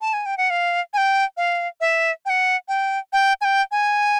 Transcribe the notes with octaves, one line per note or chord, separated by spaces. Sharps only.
A5
G#5
G5
F#5
F5
G#5
G5
F5
E5
G5
F#5
G5
G5
G#5
G5
G#5